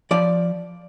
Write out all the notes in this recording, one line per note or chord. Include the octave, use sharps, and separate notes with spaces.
F3 D5